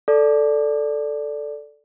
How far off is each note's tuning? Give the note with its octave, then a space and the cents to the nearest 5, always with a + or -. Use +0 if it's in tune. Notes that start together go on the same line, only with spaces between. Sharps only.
A4 +0 D5 +0